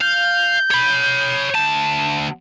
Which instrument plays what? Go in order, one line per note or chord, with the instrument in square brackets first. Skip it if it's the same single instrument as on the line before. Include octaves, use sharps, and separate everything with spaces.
[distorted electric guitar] F5 [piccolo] G6
[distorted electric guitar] C#5 B5
D2 A5